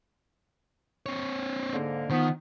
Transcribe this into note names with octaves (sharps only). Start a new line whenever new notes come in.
C4 C#5
G#2 D3 A#3
D#3 F3 B3